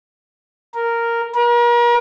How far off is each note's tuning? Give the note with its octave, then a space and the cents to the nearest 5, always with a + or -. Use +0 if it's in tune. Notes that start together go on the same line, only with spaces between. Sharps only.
A#4 -5
A#4 +40